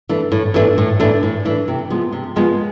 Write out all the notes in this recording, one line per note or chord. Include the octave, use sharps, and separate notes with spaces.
E3 A3 D4
A2
E3 A3 D4
A2
E3 A3 D4
A2
E3 A3 D4
C3
F3 G#3 B3
C3
F3 G#3 B3